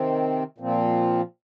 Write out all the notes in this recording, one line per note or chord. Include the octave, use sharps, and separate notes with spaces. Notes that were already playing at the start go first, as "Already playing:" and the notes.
Already playing: C3 D#3 C4
A#2 F3 C4